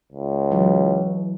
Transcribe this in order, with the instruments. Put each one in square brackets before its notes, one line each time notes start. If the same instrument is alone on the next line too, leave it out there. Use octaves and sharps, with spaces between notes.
[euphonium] C#2
[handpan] E3 F#3